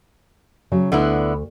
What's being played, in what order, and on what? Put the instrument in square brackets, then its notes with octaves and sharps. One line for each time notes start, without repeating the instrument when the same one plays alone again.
[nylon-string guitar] C#3 F#3
[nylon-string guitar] D2 [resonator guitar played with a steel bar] D3 B3 E4